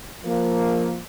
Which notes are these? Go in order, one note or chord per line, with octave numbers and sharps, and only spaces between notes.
F3 A#3